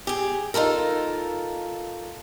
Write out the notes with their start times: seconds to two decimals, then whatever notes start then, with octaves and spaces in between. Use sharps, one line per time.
0.07 G4 G#4
0.54 D#4 F4 A4 A#4